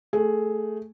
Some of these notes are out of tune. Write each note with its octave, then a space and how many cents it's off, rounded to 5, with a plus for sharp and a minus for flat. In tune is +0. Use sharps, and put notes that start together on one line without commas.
A3 +0 G#4 +5